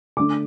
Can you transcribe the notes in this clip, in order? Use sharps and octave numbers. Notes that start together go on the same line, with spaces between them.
D3 A3 D4 D6